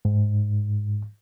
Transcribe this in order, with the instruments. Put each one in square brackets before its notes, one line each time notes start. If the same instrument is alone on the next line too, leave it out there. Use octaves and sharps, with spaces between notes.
[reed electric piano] G#2